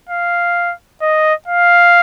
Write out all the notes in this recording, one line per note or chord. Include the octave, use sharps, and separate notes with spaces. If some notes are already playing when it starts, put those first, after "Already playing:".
F5
D#5
F5